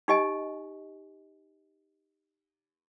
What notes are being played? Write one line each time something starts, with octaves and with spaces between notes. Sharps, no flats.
D#4 G4 D#5 G#5